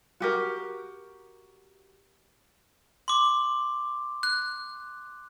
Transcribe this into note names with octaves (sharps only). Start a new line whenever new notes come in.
F#4 G4 A#4
C6 D6
F#6